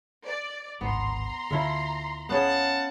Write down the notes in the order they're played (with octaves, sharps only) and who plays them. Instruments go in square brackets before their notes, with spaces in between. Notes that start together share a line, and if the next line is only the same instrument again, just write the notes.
[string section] D5
[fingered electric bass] D1 G#1 D4 [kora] B3 [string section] A#5 C6
[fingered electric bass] D2 D3 [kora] E4 F4 A4
[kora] B3 C#4 G#4 [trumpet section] F5 F#5 A5